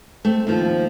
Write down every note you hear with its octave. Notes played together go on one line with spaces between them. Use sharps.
A3 C4
D#2 F3